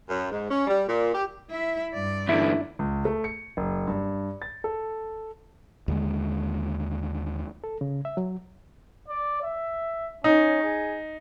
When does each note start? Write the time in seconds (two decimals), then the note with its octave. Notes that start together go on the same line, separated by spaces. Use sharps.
0.09 F#2
0.31 G#2
0.50 C#4
0.67 G3
0.89 A#2
1.13 G4
1.50 E4 E5
1.94 G2 D5
2.29 E2 D3 E4
2.79 C#2
3.05 A3
3.24 C#7
3.57 F#1
3.87 G2
4.42 A6
4.64 A4
5.88 D#2 D3 G#3
7.64 A4
7.81 C#3
8.05 E5
8.17 F#3
9.08 D5
9.43 E5
10.24 C#4 D#4
10.63 G#4